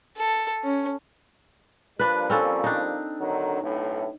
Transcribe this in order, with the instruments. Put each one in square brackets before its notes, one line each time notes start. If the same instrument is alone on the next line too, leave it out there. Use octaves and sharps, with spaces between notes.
[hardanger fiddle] A4
C#4
[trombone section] F3 G3 A#3 [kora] D4 B4
[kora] C4 C#4 A4
D4 D#4
[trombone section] D3 D#3 F#3
B1 A2